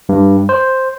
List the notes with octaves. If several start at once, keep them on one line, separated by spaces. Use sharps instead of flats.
G2
C5